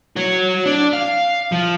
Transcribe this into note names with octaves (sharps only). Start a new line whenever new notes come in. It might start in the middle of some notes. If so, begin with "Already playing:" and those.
F#4 C#5
D4
F5
F3